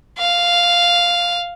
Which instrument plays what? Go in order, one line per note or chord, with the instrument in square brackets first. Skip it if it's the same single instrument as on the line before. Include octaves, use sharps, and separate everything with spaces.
[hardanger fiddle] F5